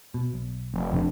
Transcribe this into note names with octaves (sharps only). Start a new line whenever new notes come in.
B2
B1
F1
F2 C3 D4